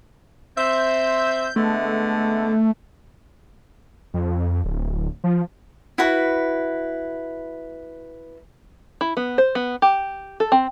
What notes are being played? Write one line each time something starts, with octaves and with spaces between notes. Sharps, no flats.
C4 C5 E5 G6
D3 G#3 A3 B3
F2
D1
F3
E4 F#4 B4
E4
B3
C5
B3
G4
A4
C4